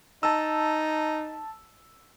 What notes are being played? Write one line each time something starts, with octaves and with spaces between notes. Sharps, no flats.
D#4 A5 E6